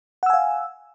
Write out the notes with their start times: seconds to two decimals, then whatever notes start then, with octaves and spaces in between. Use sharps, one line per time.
0.23 F#5
0.26 E6
0.30 G#5
0.33 F5